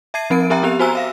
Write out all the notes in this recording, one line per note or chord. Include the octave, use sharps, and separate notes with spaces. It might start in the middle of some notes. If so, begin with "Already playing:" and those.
E5 A5 G#6 C7 D#7
F3 C4 A#4 D7
C4 G4 A#4 E5 G5 A#5
B3 G4 F7
F#4 C5 G#5 A#5 E6
E5 F5 A#6